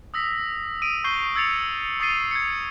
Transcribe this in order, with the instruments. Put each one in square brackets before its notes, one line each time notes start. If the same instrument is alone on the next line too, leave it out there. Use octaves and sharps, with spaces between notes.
[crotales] D#6 E6 A#6 B6
D#6 D7 D#7
C#6 G6 C7 D#7 G7
E6 G#6 A6 C#7 F7
C#6 D#6 A6 C7 D#7 G7
G#6 C#7